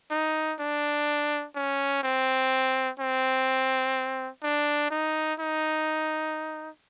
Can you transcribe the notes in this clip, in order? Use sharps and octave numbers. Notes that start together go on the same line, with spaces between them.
D#4
D4
C#4
C4
C4
D4
D#4
D#4